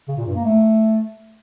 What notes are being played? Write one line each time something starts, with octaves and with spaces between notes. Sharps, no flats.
C#3
A#2
G2
A#3
A3